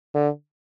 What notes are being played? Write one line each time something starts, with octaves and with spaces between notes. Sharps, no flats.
D3